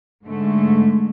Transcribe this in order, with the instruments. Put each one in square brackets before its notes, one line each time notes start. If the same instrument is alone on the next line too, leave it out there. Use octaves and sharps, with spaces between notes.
[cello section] G#2 D3 G#3 A3